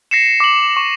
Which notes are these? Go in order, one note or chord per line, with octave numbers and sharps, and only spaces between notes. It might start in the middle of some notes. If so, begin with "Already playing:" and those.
A#6 C7 C#7 E7
D6 F#7
C#6